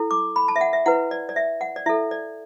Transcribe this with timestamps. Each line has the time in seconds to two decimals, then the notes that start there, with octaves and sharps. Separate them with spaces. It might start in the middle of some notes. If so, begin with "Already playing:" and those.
Already playing: E4 A4
0.11 D6
0.36 B5
0.48 A5
0.56 E5
0.61 F#5
0.73 E5
0.86 E4 B4 F#5
1.11 D5
1.29 D5
1.36 E5
1.61 F#5
1.76 D5
1.86 E4 A4 E5
2.11 D5